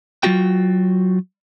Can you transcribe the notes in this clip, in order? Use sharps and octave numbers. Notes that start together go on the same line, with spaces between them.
F#3 D4 F4 F#4 G5